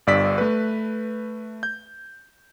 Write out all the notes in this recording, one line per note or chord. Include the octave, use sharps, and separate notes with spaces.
G1 G2 D5 E6 B6
A3 B4
G6